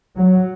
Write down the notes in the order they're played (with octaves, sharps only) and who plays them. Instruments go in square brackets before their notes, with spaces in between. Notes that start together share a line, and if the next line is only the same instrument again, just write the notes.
[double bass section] F#3